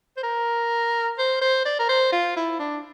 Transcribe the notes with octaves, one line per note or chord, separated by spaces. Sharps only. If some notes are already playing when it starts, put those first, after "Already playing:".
C5
A#4
C5
C5
D5
A#4
C5
F4
E4
D4